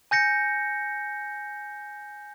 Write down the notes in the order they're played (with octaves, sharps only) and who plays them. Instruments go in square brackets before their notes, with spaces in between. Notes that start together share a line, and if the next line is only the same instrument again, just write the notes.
[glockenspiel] G#5 G6 A#6 C#7